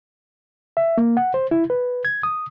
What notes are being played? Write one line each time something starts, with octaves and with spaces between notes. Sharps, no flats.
E5
A#3
F#5
C5
E4
B4
G#6
D#6